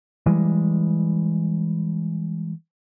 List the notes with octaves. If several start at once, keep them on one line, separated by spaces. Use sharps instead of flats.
E3 G3 G#3